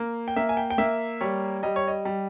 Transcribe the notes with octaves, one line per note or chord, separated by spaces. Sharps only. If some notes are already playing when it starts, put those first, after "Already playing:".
Already playing: A#3
G5
A#3 E5
G#5
G5
G5
A#3 E5
G3 C#5
G3 D#5
C#5
D#5
G3